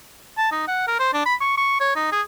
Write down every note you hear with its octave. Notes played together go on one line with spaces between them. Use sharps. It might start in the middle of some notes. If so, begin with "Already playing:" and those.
A5
D#4
F#5
A#4
C5
D4
B5
C#6
C#6
C#5
D#4
G#4